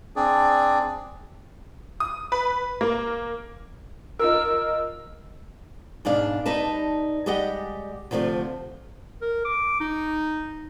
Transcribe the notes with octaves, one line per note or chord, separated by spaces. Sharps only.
C4 D4 G#4 D5
D#6
B4
A#3
D#4 F4 A#4 E6
G#2 B2 D4 F5
G3 D#4 B4 A5
G3 G#3 G4 D#5 F#5 G5
D2 C3 F3 G#3 A3
A#4
D6
D#4